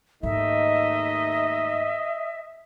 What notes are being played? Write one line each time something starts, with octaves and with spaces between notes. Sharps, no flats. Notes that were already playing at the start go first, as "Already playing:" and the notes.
D#2 G#2 A3 D#4 D#5 E5